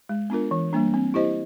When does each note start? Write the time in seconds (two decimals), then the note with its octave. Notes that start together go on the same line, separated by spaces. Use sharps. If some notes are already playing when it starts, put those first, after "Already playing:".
0.09 G#3
0.30 B3 D4 F4 A#4
0.51 E3
0.73 G3 A#3 D4
0.94 C4
1.14 E4 G4 C5 D#5